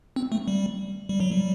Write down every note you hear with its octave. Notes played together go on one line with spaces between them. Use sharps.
C4
A3
G3
G3
F#3
G3